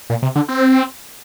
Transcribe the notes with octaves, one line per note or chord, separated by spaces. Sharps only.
A#2
C3
D3
C4